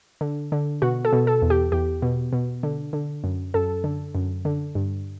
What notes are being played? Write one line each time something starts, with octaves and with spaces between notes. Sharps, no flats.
D3
D3
B2 F#4
A4
B2
A4
E2
G4
E2 G4
B2
B2
D3
D3
F#2
F#2 A4
D3
F#2
D3
G2